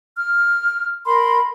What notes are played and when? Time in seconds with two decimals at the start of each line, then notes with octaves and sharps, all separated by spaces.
0.16 F6
1.06 A#4 B5 C6